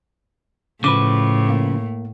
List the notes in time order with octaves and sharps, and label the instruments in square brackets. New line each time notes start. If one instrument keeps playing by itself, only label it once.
[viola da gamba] A2 [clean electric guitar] C#3 F3 B4 [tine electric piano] D6
[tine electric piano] A#3